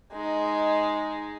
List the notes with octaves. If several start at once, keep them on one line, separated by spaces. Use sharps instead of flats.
G#3 D#4